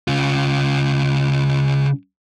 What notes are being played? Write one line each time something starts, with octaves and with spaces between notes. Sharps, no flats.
C#3 F4